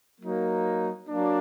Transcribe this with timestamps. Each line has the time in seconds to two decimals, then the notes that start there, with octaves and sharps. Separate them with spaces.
0.20 F#3 A#3 D#4
1.08 F#3 A#3 D4